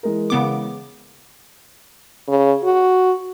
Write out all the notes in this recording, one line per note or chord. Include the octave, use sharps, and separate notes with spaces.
E3 G#3 A#4
C#3 B3 D6
C#3
F#4